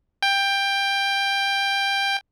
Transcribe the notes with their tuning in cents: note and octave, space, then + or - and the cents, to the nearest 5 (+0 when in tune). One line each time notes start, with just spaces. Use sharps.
G5 +15